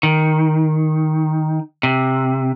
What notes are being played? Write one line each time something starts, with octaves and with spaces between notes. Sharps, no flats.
D#3
C3